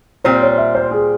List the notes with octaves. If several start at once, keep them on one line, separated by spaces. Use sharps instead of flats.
A#2 G3 C4 C5
C#5
E5
C5
G#4